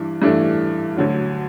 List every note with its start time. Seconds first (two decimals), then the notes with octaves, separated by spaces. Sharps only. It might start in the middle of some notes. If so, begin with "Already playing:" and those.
Already playing: G2 E3 D4
0.22 G2 E3 A3 D4
0.97 D2 D3 F#3